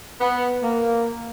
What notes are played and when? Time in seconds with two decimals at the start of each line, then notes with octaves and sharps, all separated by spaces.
0.21 B3
0.62 A#3